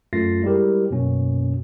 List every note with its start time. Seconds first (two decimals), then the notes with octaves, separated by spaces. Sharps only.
0.13 F#2 A3 F4 A6 A#6 C7
0.43 G3 G#3 E4 G4 A#4
0.91 F#2 B2 A#3 C#4